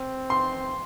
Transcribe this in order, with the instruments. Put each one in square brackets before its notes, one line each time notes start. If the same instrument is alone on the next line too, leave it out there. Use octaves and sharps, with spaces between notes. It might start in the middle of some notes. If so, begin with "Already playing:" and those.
Already playing: [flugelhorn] C4
[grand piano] C6